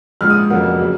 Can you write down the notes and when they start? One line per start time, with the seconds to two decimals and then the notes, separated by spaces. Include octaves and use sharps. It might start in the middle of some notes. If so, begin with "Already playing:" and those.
0.21 A#1 G#2 F3 F6
0.30 D#6
0.50 F1 F2 C#3 F#3 A#3 F#5
0.79 C#3 F#3